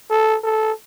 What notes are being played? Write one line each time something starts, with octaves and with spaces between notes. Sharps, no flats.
A4
A4